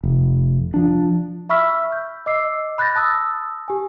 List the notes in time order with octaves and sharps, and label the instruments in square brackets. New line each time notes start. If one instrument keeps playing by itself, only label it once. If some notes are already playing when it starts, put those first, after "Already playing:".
[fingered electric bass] F1
F3 D4
[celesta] E5 B5 C#6 E6 F6 B6
G6
D#5 D6 E6 C7
B5 F#6 G6 A6 A#6
A5 D#6 E6
G4 G#5